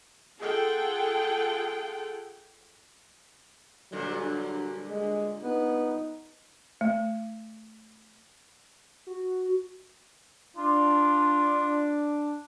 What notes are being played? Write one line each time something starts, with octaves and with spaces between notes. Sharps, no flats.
F4 G#4 A4 F#5 G5
G2 A#2 D3 F#3
G#3
B3 D#4
A3
F#4
D4 F4